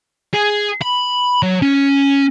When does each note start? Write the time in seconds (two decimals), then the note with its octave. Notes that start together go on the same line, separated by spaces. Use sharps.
0.33 G#4
0.82 B5
1.43 F#3
1.62 C#4